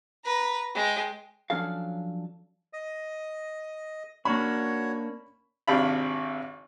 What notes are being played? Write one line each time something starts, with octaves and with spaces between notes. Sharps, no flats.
B4 A#5
G#3 G5
F3 F#3 C#4 D4 A4 F5
D#5
A#3 C#4 D4 F#4 C#5 B5 C#6
G#1 C3 D4 F5 B5